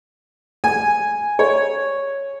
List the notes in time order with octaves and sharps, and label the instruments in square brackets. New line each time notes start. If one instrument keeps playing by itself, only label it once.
[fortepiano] G#5
C#5